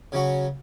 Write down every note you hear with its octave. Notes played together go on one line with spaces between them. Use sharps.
C#3 F#3 C#4 F#4